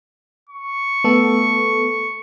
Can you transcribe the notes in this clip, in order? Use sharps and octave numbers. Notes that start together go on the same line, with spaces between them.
C#6
A3 B3 A4